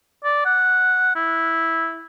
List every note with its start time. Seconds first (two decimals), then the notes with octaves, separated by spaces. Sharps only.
0.24 D5
0.45 F#5
1.16 E4